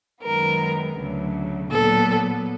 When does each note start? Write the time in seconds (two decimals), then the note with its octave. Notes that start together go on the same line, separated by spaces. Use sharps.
0.24 F#2 D#3 G#3 B3 A#4
0.97 D2 C#3 F#3
1.71 A#2 F#3 B3 A4